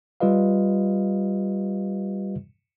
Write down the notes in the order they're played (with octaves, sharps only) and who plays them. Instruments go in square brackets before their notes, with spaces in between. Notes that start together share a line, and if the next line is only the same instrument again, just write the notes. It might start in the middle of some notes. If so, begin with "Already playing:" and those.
[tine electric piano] G3 F4 G4 B4 D#5 F5